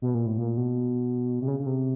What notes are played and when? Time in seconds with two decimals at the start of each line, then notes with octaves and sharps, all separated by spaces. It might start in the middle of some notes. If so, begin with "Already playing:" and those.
0.02 B2
0.14 A#2
0.26 A2
0.38 A#2
0.57 B2
1.42 C3
1.48 C#3
1.60 C#3
1.66 C3